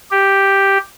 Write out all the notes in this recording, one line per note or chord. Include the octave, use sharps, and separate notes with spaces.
G4